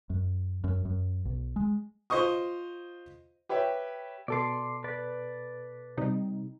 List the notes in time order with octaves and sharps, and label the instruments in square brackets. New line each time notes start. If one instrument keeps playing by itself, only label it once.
[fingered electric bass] F#2
F#2
F#2
B1
G#3
[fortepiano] F4 C5 D#5 C#6 D#6
[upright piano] G4 B4 C#5 E5 G5
[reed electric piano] B2 A4 D6 [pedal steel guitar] D5 C6
[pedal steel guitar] B4 D5
[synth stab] C3 G3 D#4